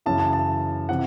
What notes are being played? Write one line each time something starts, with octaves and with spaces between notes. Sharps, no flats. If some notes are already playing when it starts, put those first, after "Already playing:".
F#2 C#3 E3 A5
A5
A5
C3 E3 F#5